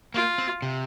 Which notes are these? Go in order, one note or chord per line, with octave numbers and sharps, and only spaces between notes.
A#3 F4
C4
C3